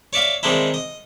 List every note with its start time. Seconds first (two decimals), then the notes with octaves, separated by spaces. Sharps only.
0.13 C#5 D5 E5 F5
0.43 D#3 G#3 C4 D4 E4
0.74 D#5